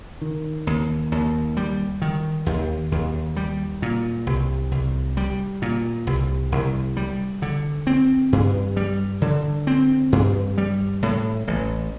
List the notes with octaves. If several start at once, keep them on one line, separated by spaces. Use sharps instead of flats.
D#3
D#2
D#2
G3
D#3
D#2
D#2
G3
A#2
C2
C2
G3
A#2
C2
C2
G3
D3
C4
G2
G3
D3
C4
G2
G3
A2
A1